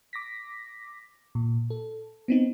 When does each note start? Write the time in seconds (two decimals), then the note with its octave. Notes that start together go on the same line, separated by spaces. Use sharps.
0.13 D6 A#6 B6
1.35 A#2
1.70 A4
2.28 B3 C4 D#4